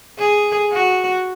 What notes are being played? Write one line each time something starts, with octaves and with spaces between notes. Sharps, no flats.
G#4
F#4